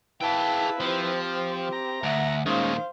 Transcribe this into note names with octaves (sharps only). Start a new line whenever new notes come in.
E4 G#4 B4 F5 G5 A5
F3 C4 G4
A#5
D2 E5 F#5
A#2 D#3 G#3 C#4 D#4 C5 F5